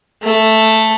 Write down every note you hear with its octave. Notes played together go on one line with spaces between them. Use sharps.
A3 A4